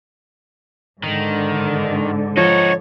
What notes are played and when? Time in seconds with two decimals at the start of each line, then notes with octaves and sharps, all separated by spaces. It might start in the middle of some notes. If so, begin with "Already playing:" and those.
1.03 G#2 D3 D#3
2.37 F3 D#4 F#4 C#5